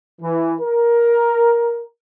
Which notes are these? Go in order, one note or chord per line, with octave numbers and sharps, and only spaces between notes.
E3
A#4